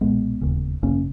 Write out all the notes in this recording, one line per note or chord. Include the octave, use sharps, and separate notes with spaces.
B1 A#2 G#3 B3
E1 D#2 C#3
G#1 F#2 C#3 A#3 C#4